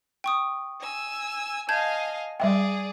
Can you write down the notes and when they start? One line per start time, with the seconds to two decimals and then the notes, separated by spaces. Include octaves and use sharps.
0.24 G5 C#6 D#6
0.81 G#5 E6
1.69 D#5 F5 G#5 A5 G6 G#6
2.40 G3 G#4 D5 E5 G5